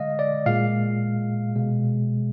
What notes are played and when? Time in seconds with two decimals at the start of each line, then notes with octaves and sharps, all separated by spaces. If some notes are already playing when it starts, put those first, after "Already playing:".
Already playing: D3 G#3 D#5 F5
0.19 D5
0.46 A#2 G#3 F5
1.56 B2 G#3